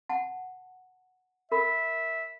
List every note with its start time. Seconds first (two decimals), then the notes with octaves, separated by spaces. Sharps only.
0.09 F#5 A5
1.52 A#4 E5 B5